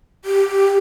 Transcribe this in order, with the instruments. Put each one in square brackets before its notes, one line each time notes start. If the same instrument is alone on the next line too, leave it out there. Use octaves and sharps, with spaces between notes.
[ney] G4